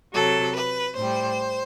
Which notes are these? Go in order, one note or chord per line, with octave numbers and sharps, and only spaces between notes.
C3 F#3 A4
B4
A2 G3 C5